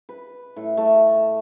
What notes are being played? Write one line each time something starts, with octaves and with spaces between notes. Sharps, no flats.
B4
A2
A3